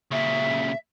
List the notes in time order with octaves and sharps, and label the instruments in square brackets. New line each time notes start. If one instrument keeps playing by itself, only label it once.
[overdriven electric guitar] A#2 C#3 [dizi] E5